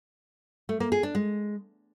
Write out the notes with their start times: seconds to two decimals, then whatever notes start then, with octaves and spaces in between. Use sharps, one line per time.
0.69 A3
0.80 A#3
0.92 G#4
1.03 D4
1.15 G#3